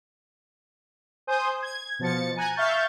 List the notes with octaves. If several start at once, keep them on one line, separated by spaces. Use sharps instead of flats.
C5 G#5 D#6 G6
G#6
B2 F3 A6 C#7
G#5 A#5 F#6 G#6
E5 F5 C#6 F6 G6 A6